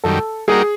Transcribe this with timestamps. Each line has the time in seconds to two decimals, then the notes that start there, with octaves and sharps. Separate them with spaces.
0.04 F#2 D#3 G3 A4
0.48 G3 A#3 D#4 F#4 G#4 A#4